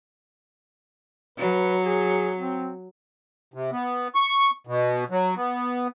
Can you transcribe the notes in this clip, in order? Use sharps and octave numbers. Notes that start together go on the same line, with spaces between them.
F#3 B4
G#4
C4
C3
B3
C#6
B2
F#3
B3